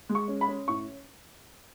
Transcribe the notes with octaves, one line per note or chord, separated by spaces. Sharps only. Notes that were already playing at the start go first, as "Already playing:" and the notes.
G#3
C#6
C#4
B5
C#4
A2 C#6